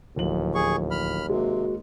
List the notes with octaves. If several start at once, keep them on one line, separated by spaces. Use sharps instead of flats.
D1 D#2 F3 F#7
G#4 C#6
B5 F6
C3 G#3 A#3 F#4